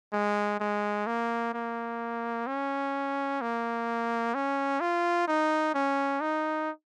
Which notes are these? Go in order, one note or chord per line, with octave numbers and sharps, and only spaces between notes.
G#3
G#3
A#3
A#3
C#4
A#3
C#4
F4
D#4
C#4
D#4